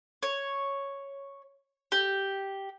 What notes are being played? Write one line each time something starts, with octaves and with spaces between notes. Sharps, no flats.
C#5
G4